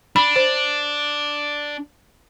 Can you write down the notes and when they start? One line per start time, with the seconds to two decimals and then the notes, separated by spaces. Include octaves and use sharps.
0.16 D4 B5
0.36 C5